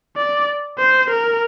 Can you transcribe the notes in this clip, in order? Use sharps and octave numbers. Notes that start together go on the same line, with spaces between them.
D5
C5
A#4